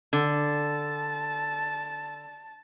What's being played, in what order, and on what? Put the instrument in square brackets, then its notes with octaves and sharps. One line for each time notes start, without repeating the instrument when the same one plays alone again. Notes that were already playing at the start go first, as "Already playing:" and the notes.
[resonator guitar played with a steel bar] D3 [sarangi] A5